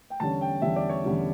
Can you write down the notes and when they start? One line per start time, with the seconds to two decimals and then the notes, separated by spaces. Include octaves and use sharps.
0.10 G5
0.20 E2 D3 G3 C#4 A5
0.41 G5
0.62 E2 D3 G3 C#4 E5
0.76 D5
0.89 C#5
1.04 E2 D3 G3 C#4